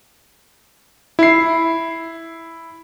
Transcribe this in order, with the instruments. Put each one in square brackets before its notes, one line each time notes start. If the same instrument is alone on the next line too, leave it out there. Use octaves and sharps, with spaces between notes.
[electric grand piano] E4 C7